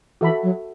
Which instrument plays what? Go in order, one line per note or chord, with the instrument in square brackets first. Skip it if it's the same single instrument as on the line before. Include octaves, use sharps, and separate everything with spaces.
[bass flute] E3 [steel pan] F#4 A4 E5 B5
[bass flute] F#3